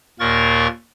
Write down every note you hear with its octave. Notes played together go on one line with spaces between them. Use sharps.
D#2 A#2 A#3 A#4 C#6 A6